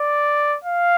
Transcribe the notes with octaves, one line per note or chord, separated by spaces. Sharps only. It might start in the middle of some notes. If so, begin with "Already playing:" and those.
Already playing: D5
F5